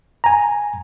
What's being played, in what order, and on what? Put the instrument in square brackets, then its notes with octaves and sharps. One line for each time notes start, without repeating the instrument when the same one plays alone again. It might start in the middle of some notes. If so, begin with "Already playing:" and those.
[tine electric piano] G#5 A#5